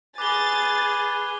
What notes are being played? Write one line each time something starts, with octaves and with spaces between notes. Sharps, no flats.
G#4 B4 D6 A6 G7